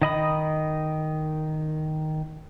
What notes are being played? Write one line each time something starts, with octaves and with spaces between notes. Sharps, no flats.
D#3 D#5 B5 D#6